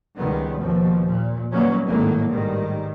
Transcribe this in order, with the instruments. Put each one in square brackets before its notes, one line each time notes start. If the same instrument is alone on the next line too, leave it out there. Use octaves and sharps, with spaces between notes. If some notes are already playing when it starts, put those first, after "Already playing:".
[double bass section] C#2 D#3 G3 B3
D#2 B2 F3
A#2
D#3 F#3 G3 A#3 B3 C#4
G#1 A2 D#3 F#3 A#3
A1 G#2 D#3 G3